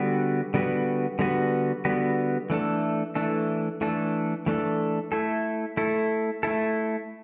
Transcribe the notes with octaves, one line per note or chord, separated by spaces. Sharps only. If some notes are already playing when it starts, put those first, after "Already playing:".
Already playing: D3 G3 B3 F#4 B4
D3 G3 B3 F#4 B4
D3 G3 B3 F#4 B4
D3 G3 B3 F#4 B4
E3 A3 D4 A4
E3 A3 D4 A4
E3 A3 D4 A4
E3 A3 D4 A4
A3 E4 A4
A3 E4 A4
A3 E4 A4